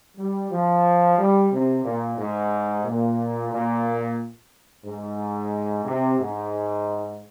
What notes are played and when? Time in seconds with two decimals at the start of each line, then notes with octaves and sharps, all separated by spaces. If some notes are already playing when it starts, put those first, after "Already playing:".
0.16 G3
0.50 F3
1.17 G3
1.51 C3
1.83 A#2
2.17 G#2
2.84 A#2
3.50 A#2
4.84 G#2
5.85 C3
6.18 G#2